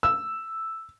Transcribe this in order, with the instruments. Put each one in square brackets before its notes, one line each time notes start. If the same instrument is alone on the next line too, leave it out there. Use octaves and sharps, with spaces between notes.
[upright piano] E6